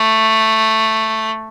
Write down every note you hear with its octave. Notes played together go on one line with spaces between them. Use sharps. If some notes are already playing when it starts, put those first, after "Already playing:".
Already playing: A3